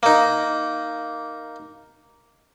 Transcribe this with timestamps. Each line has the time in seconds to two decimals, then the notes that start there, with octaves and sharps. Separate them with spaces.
0.03 A#3 D#4